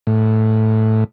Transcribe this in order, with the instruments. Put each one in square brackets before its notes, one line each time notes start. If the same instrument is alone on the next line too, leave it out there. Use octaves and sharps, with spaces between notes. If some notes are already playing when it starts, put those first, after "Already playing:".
[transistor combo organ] A2